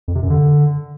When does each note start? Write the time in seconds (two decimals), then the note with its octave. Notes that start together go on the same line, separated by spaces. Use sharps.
0.08 F2
0.15 C3
0.23 F#2
0.30 D3